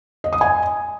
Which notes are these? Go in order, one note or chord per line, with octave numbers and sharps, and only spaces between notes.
D#5
D#6
G#5